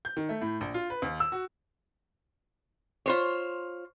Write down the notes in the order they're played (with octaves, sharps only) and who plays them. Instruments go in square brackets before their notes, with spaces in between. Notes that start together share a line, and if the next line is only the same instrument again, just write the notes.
[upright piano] G6
D#3
A3
A2
A#1
F4
B4
D#2
E6
F#4
[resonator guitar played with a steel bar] F4 C5 C#5